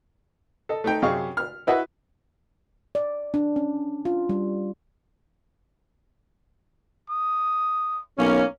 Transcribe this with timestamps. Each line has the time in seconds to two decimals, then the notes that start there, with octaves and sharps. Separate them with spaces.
0.69 A4 D#5
0.84 A3 D#4 G5
1.02 F#2 C3 G#4 D#5 F5 C#6
1.37 F6
1.67 E4 F#4 B4 D#5 E5 F#5
2.95 D5
3.34 D4
3.56 C#4
4.05 F4
4.29 G3
7.10 D#6
8.18 B1 A#3 C#4